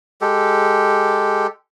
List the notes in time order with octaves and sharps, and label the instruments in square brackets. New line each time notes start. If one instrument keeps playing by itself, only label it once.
[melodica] G#3 G4 A4